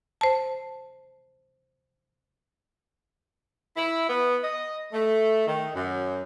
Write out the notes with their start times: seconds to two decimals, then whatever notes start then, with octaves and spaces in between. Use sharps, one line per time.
0.21 C5 A5
3.76 E4
4.08 B3
4.43 D#5
4.92 A3
5.47 D#3
5.74 F#2